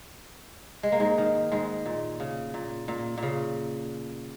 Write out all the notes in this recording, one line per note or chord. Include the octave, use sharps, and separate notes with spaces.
G#3
A#3
G#2 G#3
D#3
G#2 G#3
A#2
C#3
A#2
A#2
A#2
C#3